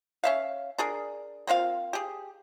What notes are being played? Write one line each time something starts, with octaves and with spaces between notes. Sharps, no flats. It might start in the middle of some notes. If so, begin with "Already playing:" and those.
C#4 E5 F5
D4 G#4 A#4
A#3 C4 F4 F5
G4 G#4